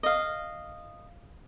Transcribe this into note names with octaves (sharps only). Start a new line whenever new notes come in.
D#5 F5